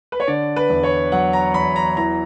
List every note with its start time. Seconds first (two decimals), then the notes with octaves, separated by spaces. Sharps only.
0.12 B4
0.20 C#5
0.27 D3 D5
0.56 B4
0.69 E2
0.83 C#5
1.12 F#3 F#5
1.33 A#5
1.54 E2 B5
1.76 A#5
1.97 E3 A#5